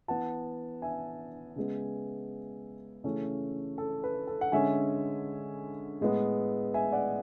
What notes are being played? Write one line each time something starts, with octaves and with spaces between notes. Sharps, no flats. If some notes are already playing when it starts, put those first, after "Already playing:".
E3 B3 F#5 A5
E5 G#5
C#3 G#3 B3
C#3 E3 A3 C#4
A4
B4
A4
F#5
D3 G#3 C#4 E5 G#5
A2 G#3 B3
E5 G#5
D5 F#5